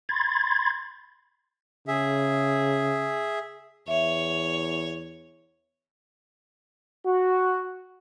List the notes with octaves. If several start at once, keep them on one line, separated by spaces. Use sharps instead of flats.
B5 C6 G#6 A6
C#3 G#4 E5
E2 C#5 E5
F#4